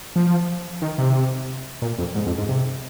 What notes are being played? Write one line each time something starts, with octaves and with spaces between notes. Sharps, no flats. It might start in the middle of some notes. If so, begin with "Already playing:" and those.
F3
D#3
C3
A#2
F2
G#2
F2
G#2
C3